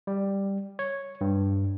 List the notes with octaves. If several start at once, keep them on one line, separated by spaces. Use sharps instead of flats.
G3
C#5
G2